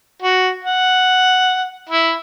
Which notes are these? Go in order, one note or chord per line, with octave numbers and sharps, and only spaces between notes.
F#4
F#5
E4